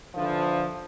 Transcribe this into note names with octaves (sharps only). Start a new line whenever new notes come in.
D3 E3 F3